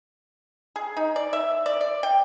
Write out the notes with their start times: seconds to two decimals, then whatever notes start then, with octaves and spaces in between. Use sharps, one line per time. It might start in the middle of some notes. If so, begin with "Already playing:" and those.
0.76 G#4
0.97 D#4
1.16 D5
1.33 E5
1.66 D5
1.81 D5
2.03 G5